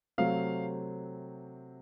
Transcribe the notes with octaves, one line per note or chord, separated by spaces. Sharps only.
C3 F#3 A3 C4 F5